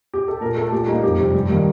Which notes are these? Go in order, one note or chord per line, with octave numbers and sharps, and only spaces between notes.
G4
A4
A#2 A#4
A3 A4
A#2 G4
G3 A#3 D#4
F2 G4
C3 G3
G2
D#3 G3 A#3